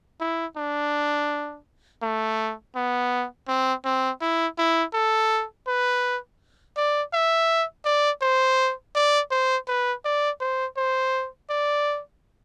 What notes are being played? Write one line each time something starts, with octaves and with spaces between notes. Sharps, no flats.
E4
D4
A3
B3
C4
C4
E4
E4
A4
B4
D5
E5
D5
C5
D5
C5
B4
D5
C5
C5
D5